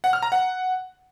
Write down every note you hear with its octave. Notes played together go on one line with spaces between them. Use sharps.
F#5
F6
A#5
F#5